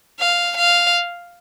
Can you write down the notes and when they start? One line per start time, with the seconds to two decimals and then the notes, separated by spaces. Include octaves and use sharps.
0.19 F5
0.57 F5